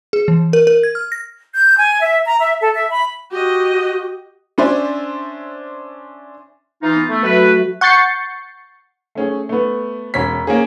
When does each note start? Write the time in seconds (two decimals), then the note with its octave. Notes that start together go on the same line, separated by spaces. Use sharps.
0.13 G#4
0.28 E3
0.53 A#4
0.67 A#4
0.83 G#6
0.95 F6
1.12 A#6
1.54 G6
1.77 G#5
2.01 E5
2.27 A#5
2.40 E5
2.61 A4
2.74 E5
2.90 B5
3.31 F#4 G4 D#5
4.58 C#4 D4 C5 E5 G#5
6.82 E3 D#4 F4
6.96 B3
7.09 A3
7.23 F#3 A3 F#4 B4 E5
7.81 F#5 C#6 G6 A6 C7 C#7
9.15 A3 C#4 G#4
9.49 A3 B3
10.14 E1 C#4 C#5 B6
10.47 A#3 C#4 G#4